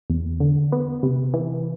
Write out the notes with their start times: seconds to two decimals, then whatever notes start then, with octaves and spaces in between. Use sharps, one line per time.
0.10 E2
0.40 D3
0.72 B3
1.03 C3
1.34 E3